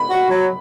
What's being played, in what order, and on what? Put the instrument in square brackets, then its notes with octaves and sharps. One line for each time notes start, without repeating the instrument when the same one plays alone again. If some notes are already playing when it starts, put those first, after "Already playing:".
Already playing: [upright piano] B5
[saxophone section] F#4
F#3